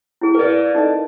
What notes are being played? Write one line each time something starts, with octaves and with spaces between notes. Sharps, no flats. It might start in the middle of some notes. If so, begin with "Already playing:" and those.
E4 G#4
G#4 A#4 B4 D5
D#4 A4 D#5